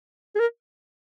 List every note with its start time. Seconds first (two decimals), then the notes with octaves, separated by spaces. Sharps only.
0.35 G#4
0.39 A#4